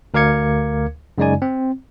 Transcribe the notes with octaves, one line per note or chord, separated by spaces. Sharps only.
D2 A#4 F5 D6 G#6 C#7
F#2 C#3 G#3 D#4 D5 G#5
C4